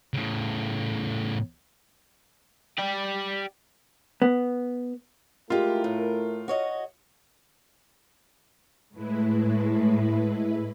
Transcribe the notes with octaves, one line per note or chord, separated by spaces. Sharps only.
A2 C#3
G4 D5
B3
G#3 A3 E4 F4 G4 A#4
A2
F#4 C#5 D#5
A2 G#3 E4 B4